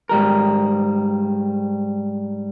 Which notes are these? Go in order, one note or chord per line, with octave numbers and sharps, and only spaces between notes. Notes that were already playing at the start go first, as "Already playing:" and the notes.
G#2 G3 A#4